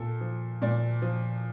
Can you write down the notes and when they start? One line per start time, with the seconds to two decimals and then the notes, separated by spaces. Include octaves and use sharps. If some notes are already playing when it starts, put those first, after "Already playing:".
Already playing: A#2 A4
0.21 F3
0.62 A#2 D5
1.02 F3